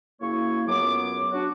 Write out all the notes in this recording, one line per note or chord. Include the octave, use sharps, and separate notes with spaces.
F#2 C#3 A#3 E4 C#5 C#6
C#2 F#2 F#3 B3 D6
F#3 C#4 D4 F#4